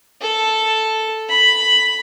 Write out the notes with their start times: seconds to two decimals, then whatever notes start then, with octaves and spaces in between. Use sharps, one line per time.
0.21 A4
1.29 B5